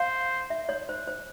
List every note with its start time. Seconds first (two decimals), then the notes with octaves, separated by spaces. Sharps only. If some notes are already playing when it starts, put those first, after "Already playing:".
Already playing: C5 F5
0.50 E5
0.69 C#5
0.89 C5
1.07 C5